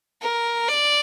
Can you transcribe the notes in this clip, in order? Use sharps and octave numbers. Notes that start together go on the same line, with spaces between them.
A#4
D5